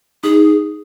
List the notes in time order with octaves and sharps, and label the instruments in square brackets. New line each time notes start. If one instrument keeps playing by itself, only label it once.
[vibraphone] D#4 [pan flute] G#4